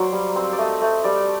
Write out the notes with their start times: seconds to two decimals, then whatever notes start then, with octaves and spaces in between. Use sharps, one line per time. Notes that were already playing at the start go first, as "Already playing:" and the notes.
Already playing: F#3 A#3 A#4 C5 D5
0.13 G3
0.36 C4
0.53 D5
0.58 A3 D#5
0.82 A3
1.04 G3 D5